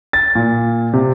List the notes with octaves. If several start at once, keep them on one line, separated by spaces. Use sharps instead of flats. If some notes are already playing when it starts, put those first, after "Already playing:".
A6
A#2
C3